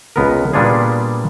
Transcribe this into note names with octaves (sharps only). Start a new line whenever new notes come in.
C#2 B3 A#4
A#2 G3 B3 D4 F4 G#4